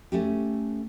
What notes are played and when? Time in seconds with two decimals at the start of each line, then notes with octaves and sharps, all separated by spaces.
0.12 A3 C#4 G4